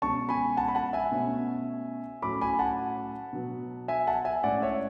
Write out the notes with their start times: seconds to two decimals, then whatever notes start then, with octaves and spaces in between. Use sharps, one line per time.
0.02 B2 G#3 C#4 A5 C#6
0.29 G#5 B5
0.57 F#5 A5
0.68 B5
0.75 F#5 A5
0.93 E5 G#5
1.12 B2 A3 C#4
2.22 A2 F#3 A3 C#4 B5 D6
2.41 G#5 B5
2.59 F#5 A5
3.33 B2 F#3 B3
3.88 E5 G#5
4.07 F#5 A5
4.25 E5 G#5
4.43 A2 G#3 C#4 D5 F#5
4.62 C#5 E5